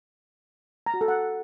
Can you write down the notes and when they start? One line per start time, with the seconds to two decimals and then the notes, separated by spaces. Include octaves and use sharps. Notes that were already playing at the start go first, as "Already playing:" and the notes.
0.86 A#5
0.94 F#4
1.01 A4
1.08 F#5